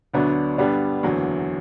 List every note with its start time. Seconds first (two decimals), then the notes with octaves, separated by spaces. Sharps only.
0.14 D2 D3 F#3 B3 D4
0.58 G2 D3 G3 B3 D4
1.03 F#1 E2 D3 F#3